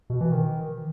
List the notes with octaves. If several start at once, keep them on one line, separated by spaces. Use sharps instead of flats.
B2
E3
D#3